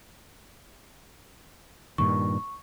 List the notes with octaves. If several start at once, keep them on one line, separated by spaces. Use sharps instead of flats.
G2 A#2 D#3 C#6